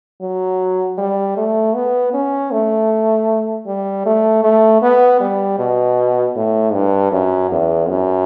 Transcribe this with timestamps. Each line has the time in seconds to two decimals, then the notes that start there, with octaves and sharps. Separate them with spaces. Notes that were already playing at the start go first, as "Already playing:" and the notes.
0.21 F#3
0.98 G3
1.37 A3
1.75 B3
2.13 C#4
2.51 A3
3.66 G3
4.06 A3
4.43 A3
4.82 B3
5.20 G3
5.59 B2
6.36 A2
6.73 G2
7.12 F#2
7.51 E2
7.89 F#2